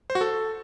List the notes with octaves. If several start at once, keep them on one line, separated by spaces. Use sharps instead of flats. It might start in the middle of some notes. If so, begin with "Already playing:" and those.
C5
F#4
A4